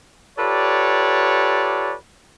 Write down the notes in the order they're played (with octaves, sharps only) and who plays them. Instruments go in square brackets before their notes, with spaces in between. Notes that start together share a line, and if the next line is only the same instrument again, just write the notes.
[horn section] F4 G4 A4 B4 C#5 D5